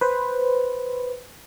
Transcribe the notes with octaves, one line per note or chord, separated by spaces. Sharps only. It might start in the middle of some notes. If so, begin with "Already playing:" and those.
B4 C5